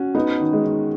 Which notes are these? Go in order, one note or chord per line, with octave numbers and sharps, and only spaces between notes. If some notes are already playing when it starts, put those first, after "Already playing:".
Already playing: C#4 F#4
B3 D#4
D#3
G#3
D#3